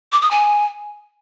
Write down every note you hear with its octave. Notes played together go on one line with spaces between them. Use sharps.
D6
D#6
G#5